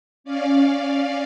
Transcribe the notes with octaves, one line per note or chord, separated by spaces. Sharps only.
C#4 D5 F5